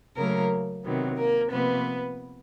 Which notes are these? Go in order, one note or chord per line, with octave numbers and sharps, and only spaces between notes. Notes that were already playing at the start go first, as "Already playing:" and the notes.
C#3 F#3 A3 A#3 A#4
C3 D#3 F#3 B3
A#3 A#4
C3 F3 A#3 B3 B4